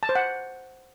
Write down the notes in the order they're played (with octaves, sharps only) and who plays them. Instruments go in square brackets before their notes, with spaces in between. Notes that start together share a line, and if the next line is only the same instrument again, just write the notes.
[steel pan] A5
C5
F#5